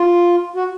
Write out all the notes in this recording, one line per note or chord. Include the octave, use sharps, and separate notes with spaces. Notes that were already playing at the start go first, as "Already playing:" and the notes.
Already playing: F4
F#4